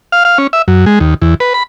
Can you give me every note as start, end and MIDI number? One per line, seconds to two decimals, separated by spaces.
0.12 0.23 77
0.25 0.38 77
0.38 0.47 61
0.53 0.62 76
0.68 0.85 42
0.86 0.99 56
1.00 1.14 39
1.22 1.34 40
1.40 1.53 71
1.54 1.63 83